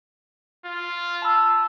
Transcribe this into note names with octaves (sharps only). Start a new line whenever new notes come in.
F4
A5 B5 E6